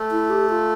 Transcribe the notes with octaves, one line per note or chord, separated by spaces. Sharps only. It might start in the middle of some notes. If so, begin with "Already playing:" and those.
Already playing: A3
E4
G4
F4